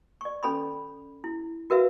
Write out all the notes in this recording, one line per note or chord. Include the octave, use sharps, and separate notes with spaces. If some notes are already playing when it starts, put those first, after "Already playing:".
D5 C#6
C#4 A4 B5 C6
E4
F#4 A#4 B4 E5 F5